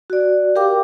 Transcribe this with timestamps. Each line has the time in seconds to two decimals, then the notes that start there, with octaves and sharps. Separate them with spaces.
0.10 F#4 D5
0.56 G4 A#4 F5 G5 D6